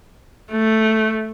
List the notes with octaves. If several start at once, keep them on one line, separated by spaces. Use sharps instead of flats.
A3